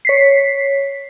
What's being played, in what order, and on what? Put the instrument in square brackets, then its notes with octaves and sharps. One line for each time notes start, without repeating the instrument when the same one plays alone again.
[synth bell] C#5 B6 C7